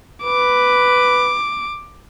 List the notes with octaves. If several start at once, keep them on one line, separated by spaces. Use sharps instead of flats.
B4 D6